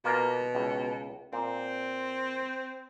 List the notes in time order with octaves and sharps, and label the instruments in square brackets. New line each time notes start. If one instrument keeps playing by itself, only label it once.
[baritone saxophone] B2 [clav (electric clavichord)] A#3 F4 A#4
[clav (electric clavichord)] C#2
[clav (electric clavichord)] A#2 [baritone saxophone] C4